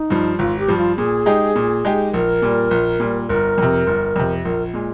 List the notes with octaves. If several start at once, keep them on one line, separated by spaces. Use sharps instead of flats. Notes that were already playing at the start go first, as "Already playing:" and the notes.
Already playing: D#4
G2 F3
G#1 F4
G4
G2 F3
F4
A#2 G#4
G#3 D#4 G4
A#2
G#3 D#4 G4
A#1 A#4
A#2 G3
A#1
A#2 G3
G1 A#4
F2 C3
G1
F2 C3
A#1 A#4
A#2 G#3